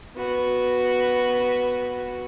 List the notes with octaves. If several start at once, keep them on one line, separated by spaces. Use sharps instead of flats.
B3 F#4